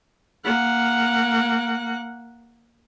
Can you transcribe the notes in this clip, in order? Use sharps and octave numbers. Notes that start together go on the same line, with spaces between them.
A#3 F#5